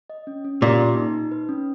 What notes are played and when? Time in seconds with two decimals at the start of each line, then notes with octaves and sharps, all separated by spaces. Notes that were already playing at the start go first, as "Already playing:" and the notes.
0.10 D#5
0.27 C#4
0.45 C#4
0.61 A#2 G4
0.79 A#3
0.96 D#4
1.14 D#4
1.32 B4
1.49 C#4